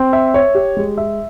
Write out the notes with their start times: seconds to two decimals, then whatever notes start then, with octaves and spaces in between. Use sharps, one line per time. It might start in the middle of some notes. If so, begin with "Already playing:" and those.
Already playing: C4
0.13 E5
0.34 C#5
0.55 G4
0.77 G#3
0.98 E5